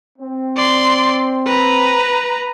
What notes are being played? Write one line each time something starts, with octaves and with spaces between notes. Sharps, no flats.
C4
D5 C6
B4 A#5